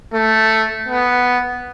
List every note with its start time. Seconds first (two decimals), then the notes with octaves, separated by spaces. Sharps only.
0.14 A3
0.88 B3